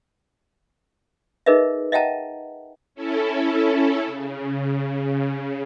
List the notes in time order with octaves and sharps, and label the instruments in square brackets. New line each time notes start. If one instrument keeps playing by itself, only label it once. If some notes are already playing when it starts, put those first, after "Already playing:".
[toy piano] D#4 G#4 A#4 B4 D#5 E5
D#5 E5 F#5 G5 A5 A#5
[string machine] C#4 E4 A4
C#3